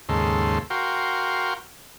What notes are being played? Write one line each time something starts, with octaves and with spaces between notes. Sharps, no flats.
D#2 G#2 C#3 A4 C6
F#4 A#4 F5 G5 C6